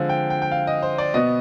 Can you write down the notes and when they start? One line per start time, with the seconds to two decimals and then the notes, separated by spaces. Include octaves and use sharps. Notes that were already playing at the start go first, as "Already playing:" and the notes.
Already playing: D3 F3 G#3 C4 F5
0.09 G5
0.30 G5
0.42 G5
0.52 F5
0.67 D#5
0.83 C5
0.98 D5
1.14 B2 B3 D#5